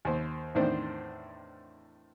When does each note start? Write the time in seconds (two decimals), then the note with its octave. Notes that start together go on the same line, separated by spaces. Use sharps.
0.05 D#2 C5
0.55 E2 A2 D#3 C4 D4 C5